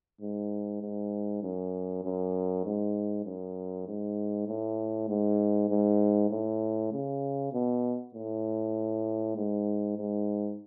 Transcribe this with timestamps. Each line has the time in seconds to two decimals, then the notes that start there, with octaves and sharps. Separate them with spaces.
0.21 G#2
0.82 G#2
1.42 F#2
2.04 F#2
2.65 G#2
3.25 F#2
3.87 G#2
4.48 A2
5.09 G#2
5.70 G#2
6.30 A2
6.92 C#3
7.53 B2
8.14 A2
9.37 G#2
9.97 G#2